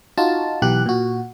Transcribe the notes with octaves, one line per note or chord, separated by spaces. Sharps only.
D#4 F4 F#4 A5
B1 E3 G4 F#6
A#2 F#4